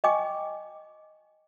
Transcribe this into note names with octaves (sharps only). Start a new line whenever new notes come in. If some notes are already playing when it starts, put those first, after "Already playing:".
D#5 G5 G#5 C#6 D6